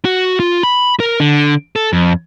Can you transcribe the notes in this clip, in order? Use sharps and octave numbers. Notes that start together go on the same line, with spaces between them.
F#4
F4
B5
A#4
D3
A4
F2